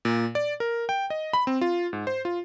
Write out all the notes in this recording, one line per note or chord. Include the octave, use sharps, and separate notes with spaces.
A#2
D5
A#4
G5
D#5
B5
C4
F4
G#2
C5
F4